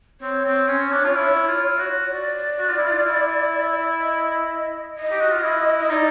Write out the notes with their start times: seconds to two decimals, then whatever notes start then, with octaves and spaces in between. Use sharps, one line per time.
0.21 C4 C#5
0.45 C4
0.68 C#4
0.92 D4
1.04 F4
1.16 E4
1.48 F4
1.79 F#4
2.04 C#5
2.11 D5
2.59 F#4
2.69 F4
2.78 E4
2.87 F4
3.05 E4
4.01 D#5
4.95 D#5
5.11 G4
5.21 F#4
5.32 F4
5.43 E4
5.79 E4 D#5
5.89 D#4 D5